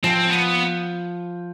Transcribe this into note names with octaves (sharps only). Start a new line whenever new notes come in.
F3 C4
B3